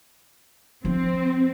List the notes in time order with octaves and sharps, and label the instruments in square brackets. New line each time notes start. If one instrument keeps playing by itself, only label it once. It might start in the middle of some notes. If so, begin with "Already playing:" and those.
[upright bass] F3 [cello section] C4